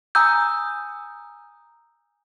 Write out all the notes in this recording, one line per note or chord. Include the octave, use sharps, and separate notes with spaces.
G#5 A#5 D#6 E6 G6